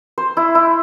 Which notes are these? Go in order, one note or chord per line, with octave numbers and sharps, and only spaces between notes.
C5
E4
E4